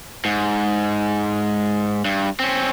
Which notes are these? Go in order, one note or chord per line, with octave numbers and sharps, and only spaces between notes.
G#2
G2
C4 C#4